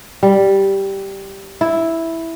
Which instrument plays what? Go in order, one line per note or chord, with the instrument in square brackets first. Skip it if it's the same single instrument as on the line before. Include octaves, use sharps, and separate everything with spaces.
[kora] G3
E4